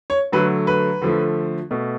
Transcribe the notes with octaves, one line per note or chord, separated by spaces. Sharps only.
C#5
D3 F#3 A3 B4
B4
D3 F3 A3
B2 A3